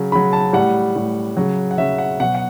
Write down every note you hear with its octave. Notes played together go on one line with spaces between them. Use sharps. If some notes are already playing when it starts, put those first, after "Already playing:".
Already playing: C#3 F#3
C#3 F#3 B5
A5
A2 G3 F#5
A2 G3
C#3 F#3
F#5
C#3 F#3 E5
F#5
B2 F#3 F#5
F#5